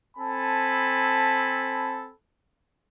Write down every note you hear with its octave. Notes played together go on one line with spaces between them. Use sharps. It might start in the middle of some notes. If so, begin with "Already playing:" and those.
C4 A4 G#5 A5 B5